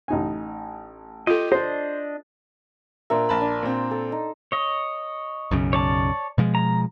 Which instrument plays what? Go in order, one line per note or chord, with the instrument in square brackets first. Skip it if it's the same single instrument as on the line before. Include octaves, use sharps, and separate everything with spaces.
[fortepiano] A1 D#4 G#5
[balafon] F4 A4 [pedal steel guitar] G4 D#5
[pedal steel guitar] D4 D#5 [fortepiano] C5
[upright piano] A#2 D4 E5 [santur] A#4 C5
[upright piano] A#1 A5 B5
[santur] D4
[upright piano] A#2 C4
[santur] A4
D#4
[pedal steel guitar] C#5 D#5
[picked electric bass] B1 F#2 C#3
[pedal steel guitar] C#5 D5 A5
[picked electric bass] B2 F3 G#3
[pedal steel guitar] A#5